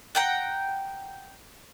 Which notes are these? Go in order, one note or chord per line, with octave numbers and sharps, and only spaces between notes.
F#5 G5 A#5